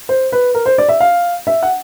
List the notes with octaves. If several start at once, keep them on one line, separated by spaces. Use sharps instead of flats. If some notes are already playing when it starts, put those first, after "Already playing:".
C5
B4
A#4
C5
D5
E5
F5
E5
F#5